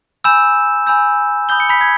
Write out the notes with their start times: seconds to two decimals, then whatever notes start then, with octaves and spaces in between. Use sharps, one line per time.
0.24 G#5 B5 E6 G6 E7
0.87 G#5 B5 E6 G6
1.49 B5 D#6 G6 G7
1.60 C#7
1.69 B5 B6
1.81 G#6